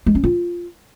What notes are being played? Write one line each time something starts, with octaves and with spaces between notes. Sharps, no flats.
G#3
C#4
F4